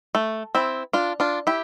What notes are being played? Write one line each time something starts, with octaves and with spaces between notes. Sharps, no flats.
A3
C4 E4
D4 F4
D4 F4
E4 G4